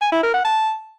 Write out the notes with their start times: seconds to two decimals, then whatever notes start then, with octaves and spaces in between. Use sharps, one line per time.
0.01 G#5
0.12 E4
0.23 A#4
0.34 F#5
0.45 A5